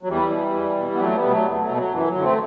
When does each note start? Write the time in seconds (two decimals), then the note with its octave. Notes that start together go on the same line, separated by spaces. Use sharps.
0.03 F#3
0.08 E2 E3 G3
0.32 B2
0.54 E2
0.77 B2
0.95 B3
1.00 E2 F#3 A3
1.16 G3 B3
1.23 B2
1.31 F#3 A3
1.47 E2
1.61 F#3 A3
1.69 B2
1.77 F#3
1.92 F#2 E3
2.08 F#3
2.15 D3
2.22 A3 C4